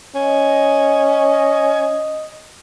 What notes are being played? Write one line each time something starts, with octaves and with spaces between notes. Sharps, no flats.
C#4 D#5